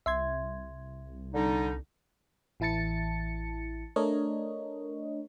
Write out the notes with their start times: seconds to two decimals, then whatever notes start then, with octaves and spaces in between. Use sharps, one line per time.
0.06 C2 E5 C6 G#6
1.34 D3 G3 D#4
2.60 A1 E3 E4 A5 A6 C#7
3.96 A3 D4 A#4 C#5 D#5